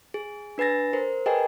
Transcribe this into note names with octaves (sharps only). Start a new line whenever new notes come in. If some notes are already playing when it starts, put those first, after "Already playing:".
G#4
D4 B4 G#5 A6 A#6
A#4 C5
G#4 A#4 B4 D#5 G5 G#5